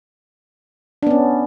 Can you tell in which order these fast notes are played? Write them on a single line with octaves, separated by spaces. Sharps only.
D4 B3 C#4